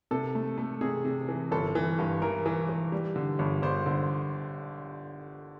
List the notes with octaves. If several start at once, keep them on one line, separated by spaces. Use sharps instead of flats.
C3 A4
A3
A3
C3 G#4
C3
E3
G1 A4
E3
G2
E3 A#4
E3
E3
G3
D3
G1
G1 C5
D3